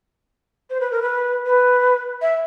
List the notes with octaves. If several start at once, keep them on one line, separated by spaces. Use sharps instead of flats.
C5
B4
A#4
B4
B4
E5